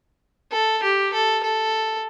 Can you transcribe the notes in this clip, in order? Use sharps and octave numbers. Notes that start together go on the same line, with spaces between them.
A4
G4
A4
A4